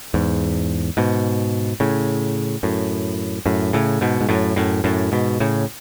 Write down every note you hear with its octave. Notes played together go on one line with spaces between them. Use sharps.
E2 G#2
G#2 B2
A2 C#3
F#2 A2
F#2 A2
A2 C#3
G#2 B2
G#2
F#2 A2
F#2 A2
F#2 A2
G#2 B2
A2 C#3